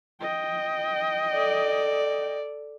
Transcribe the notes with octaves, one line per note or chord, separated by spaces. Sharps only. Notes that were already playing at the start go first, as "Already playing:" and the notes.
D#5 G5
A4 D5